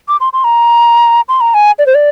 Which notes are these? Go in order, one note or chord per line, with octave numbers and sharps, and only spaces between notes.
D6
C6
C6
A#5
C6
A#5
G#5
D5
C5
D5